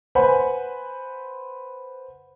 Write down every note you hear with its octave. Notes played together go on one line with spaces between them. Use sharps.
B4 C5 F#5 G#5 B5